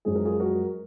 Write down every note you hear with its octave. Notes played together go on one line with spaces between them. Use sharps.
F#2 F3 G#3 G#4
A#4
F4 G#4
F#4 A#4